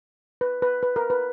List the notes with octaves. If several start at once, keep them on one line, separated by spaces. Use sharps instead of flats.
B4
B4
B4
A#4
B4